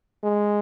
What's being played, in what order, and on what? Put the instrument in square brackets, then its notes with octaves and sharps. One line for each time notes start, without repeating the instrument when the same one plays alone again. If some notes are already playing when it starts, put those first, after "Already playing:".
[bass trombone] G#3